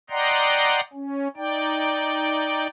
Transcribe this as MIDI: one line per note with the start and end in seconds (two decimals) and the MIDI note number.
0.10 0.80 74
0.10 0.80 75
0.10 0.80 78
0.10 0.80 79
0.10 0.80 82
0.10 0.80 84
0.93 1.28 61
1.36 2.67 63
1.36 2.67 74
1.36 2.67 79